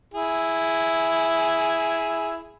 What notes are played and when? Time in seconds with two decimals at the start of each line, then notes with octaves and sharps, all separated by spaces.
0.14 E4 G#4